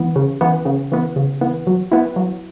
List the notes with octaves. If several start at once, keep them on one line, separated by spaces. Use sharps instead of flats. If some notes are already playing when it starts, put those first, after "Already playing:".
Already playing: E3 B3
C#3
E3 B3
C#3
E3 B3
C#3
E3 B3
F#3
B3 E4
F#3